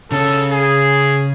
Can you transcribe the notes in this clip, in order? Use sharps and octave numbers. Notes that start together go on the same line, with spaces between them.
C#3 C#4 A4
G#4